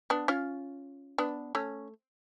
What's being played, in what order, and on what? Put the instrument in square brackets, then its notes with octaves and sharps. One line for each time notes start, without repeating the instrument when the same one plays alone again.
[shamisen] B3 D4
C#4 F4
B3 D4
A3 C#4